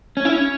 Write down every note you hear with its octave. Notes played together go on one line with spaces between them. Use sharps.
C#4
E4
C#4